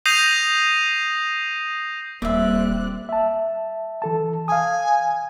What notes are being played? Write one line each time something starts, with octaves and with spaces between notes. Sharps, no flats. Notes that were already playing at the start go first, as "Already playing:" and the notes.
D#6 G6 A#6 C7 D#7 F7
D#1 G3 A#3 C4 D5 E5 F#6
E5 A5
E3 A4 A5
F5 G#5 D#6